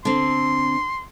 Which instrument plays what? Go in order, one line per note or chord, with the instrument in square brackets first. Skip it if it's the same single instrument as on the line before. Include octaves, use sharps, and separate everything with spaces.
[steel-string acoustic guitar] D3 C4 [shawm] C6